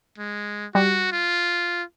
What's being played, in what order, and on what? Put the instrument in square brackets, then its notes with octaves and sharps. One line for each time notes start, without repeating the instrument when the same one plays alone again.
[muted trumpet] G#3
[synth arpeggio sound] G3 [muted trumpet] F#4
[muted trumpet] F4